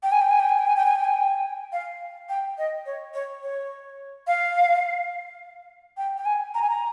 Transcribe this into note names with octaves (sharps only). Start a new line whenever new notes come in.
G5
G#5
G5
G#5
G5
G#5
G5
G#5
G5
G#5
G5
G#5
G5
F5
G5
D#5
C#5
C#5
C#5
F5
G5
G5
G#5
A#5
G#5
A#5